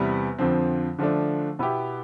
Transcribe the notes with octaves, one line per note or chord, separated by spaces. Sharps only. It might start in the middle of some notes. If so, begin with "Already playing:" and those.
Already playing: E2 C3 G3 B3 E4
F2 D3 F3 C4
D3 F3 A3 D4
B2 B3 E4 G4